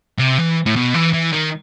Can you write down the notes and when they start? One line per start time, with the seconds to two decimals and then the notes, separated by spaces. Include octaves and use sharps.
0.18 C3
0.38 E3
0.66 A2
0.76 B2
0.94 E3
1.13 E3
1.33 D#3